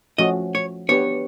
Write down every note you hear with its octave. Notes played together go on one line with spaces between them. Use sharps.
F3 A3 C#4 F#4 D#5
C#5
B3 D4 G4 B4 C#5